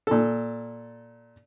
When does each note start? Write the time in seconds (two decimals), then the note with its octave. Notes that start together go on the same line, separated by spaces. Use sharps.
0.07 A#2 A4